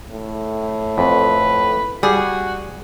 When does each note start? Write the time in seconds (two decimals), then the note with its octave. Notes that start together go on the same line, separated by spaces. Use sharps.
0.11 A2
0.98 F2 B4
2.03 G3 F#4 G#4